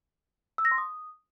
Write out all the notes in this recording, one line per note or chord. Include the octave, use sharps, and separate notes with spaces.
E6
A#6
C6
D#6